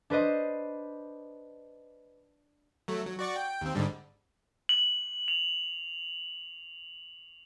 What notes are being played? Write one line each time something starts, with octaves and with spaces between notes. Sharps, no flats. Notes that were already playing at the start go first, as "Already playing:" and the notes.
D4 B4 C5 D#5
F#3 A3
F#3
F#4 D5 C#6
G5
D#2 C4
G#2 D3 G3
F#7
F7